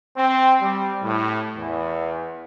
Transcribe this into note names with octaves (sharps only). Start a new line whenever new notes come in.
C4
G3
A2
E2